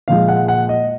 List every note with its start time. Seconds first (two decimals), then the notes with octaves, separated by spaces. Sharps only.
0.08 A#2 F3 G#3 F5
0.28 F#5
0.48 F#5
0.69 D#5